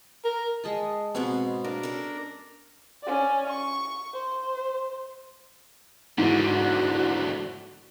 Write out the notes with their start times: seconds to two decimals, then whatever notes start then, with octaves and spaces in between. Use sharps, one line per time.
0.25 A#4
0.64 G#3 D#5 A5
1.15 G#2 B2 G#3 B3 C4 C#5
1.64 A#3 D4 A#4
1.83 C#4 A4
3.03 C#4 D5
3.49 C#6
4.13 C5
6.18 E2 G#2 D3 E3 F#4